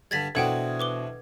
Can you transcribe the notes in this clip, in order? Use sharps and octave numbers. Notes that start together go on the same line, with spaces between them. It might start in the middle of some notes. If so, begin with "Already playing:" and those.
G2 D3 G3 G#6 A6 B6
B2 E3 C4 D4 A4 F#5 G5 G#6
B4 D6 G7